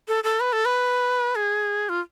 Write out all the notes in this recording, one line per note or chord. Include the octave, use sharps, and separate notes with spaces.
A4
A4
B4
A4
B4
G#4
F4